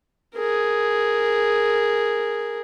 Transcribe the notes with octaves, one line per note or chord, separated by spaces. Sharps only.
G#4 A#4